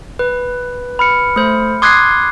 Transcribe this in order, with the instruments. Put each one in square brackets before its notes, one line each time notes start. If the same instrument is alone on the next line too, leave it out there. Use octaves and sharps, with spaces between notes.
[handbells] B4
[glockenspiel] B5 F6 C#7
[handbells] A3 C5
[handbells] C6 D#6 G#6 [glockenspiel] D6 F#6 C7